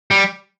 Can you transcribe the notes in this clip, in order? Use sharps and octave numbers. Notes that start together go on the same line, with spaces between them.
G3